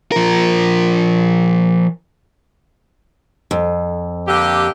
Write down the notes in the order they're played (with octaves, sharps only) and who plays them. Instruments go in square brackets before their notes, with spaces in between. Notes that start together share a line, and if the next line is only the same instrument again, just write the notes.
[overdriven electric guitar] F3 A#4
[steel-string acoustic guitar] F2
[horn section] D3 A#3 G4